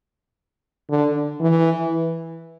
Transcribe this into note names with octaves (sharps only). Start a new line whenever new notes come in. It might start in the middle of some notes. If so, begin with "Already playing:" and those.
D3
E3